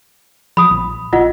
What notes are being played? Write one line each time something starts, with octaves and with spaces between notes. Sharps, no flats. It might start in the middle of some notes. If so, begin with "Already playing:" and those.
F3 B5 D#6
A#1
A#1 F4 D#5 F#5